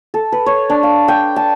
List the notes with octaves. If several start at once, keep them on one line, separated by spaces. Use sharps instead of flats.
A4
B4
C#5
D4
F5
G5
A5